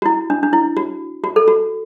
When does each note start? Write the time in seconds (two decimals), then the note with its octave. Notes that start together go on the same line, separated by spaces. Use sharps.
0.02 F#4
0.06 E4
0.30 D4
0.43 D4
0.53 E4
0.77 F#4
1.24 F#4
1.36 A4
1.48 F#4